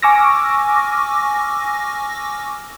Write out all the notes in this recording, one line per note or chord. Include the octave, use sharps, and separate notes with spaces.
G#5 C#6 D6 E6 F6 A#6